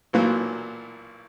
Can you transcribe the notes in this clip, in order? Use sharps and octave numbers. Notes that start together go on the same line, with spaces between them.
B1 A#2 E3 F#3 A#3 F#6